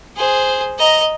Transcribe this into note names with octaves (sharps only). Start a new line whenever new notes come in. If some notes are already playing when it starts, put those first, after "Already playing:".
G#4 C5
D#5 A#5